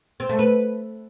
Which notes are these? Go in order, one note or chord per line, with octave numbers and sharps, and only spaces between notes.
C4
A3
B4